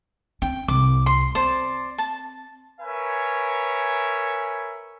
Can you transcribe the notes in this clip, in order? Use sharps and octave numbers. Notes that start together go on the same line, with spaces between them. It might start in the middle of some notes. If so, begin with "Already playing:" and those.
C4 C#4 G5
C2 D6
C6
C4 C5 D5 A5
A5
A#4 B4 C#5 E5 G#5